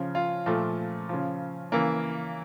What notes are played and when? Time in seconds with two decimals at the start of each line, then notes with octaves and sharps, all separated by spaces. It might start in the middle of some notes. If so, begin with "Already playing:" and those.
Already playing: C#3 F3
0.15 F4
0.46 A#2 F3 A3
1.09 C#3 F3
1.72 C#3 E3 A#3